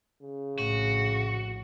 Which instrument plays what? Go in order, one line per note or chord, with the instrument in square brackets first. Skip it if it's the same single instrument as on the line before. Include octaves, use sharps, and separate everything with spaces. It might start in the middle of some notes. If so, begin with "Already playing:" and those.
[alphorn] C#3
[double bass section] A#1 A2 [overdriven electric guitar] F#4